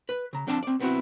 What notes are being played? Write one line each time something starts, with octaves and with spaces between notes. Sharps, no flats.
B4
C#3 A#5
F3 C4 D4 F5 A5
C4 D5
B1 B3 C4 E4 F#4